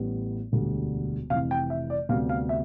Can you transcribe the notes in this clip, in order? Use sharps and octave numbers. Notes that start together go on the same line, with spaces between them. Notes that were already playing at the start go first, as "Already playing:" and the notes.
Already playing: A1 A2 G3 B3
E1 D2 D3 G3
F1 F2 E3 F5
G5
E5
D5
D2 C3 G3 B3 F5
F5
E5